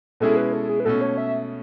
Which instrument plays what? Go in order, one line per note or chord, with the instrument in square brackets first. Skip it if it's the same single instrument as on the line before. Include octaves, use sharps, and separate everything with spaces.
[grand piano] B2 G#3 C#4 E4 G#4 [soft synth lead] A4
[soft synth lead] B4
A4
G#4
B4
[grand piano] B2 A3 C#4 [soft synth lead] A4
[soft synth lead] C#5
E5